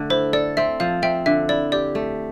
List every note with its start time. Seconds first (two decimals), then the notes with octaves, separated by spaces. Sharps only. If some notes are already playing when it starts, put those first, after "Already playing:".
Already playing: D3 A3
0.10 E4 C5
0.33 A4 D5
0.57 C4 E5
0.80 F3 F5
1.02 C4 E5 G5
1.26 D3 E5
1.49 E4 D5
1.72 G4 D5
1.95 A3